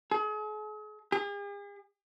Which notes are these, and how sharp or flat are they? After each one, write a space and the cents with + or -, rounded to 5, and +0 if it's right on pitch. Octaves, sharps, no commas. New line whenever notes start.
G#4 +40
G#4 -45